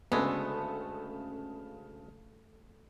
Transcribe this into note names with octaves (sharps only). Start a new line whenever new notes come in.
D2 C#3 G#3 A3 B3 A5